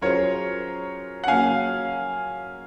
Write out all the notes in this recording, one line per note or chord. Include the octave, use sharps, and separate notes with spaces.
F#3 C#4 F4 G#4 A#4 C5 C#5
F#5
C#3 F#3 A#3 C#4 F5 G#5